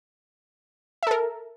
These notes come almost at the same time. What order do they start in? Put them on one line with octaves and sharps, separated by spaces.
E5 A4 A#4